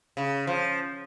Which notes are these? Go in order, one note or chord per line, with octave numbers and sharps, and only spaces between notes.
C#3
F3